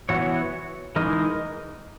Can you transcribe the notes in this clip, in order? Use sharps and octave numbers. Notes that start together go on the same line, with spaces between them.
E3 B3 F#4 C#5
E3 G#3 D#4 A#4